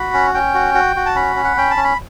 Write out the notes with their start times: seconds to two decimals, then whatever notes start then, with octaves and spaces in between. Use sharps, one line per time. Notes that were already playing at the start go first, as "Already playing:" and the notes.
Already playing: F#4 B5
0.14 C#4
0.34 C#4 G5
0.55 F#4
0.75 F#4
0.96 F#4
1.06 A5
1.15 C#4 B5
1.36 C#4
1.44 F#5
1.57 C#4 G5
1.71 A5
1.77 C#4
1.84 B5